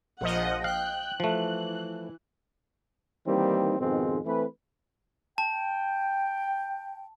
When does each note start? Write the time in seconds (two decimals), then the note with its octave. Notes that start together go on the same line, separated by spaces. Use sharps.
0.21 A#1 F3 D#5 F#5
0.64 F5 G5 F#6
1.20 E3 F3 A3
3.27 D#3 E3 G3 A#3 C4 D#4
3.79 F2 G#2 B2 D#3 G#3 C4
4.26 E3 A3 C4 B4
5.38 G5 A5